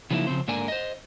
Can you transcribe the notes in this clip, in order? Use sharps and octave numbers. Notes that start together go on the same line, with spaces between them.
C#3 F3 F#3 A#3 D#4 E4
C#3 F3 C4 C5
G#2 D3 A#3 A#4 D5 G#5
C5 D#5